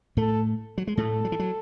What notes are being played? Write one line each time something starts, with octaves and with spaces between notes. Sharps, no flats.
A2 A3 A4
F#3
G#3
A2 A3 A4
F#3
E3
F#3